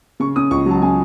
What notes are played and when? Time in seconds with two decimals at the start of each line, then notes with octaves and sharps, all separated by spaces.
0.20 C#3 C#6
0.36 C#4 D#6
0.51 C#2 C#6
0.66 F#3 A5
0.82 C#3 G#5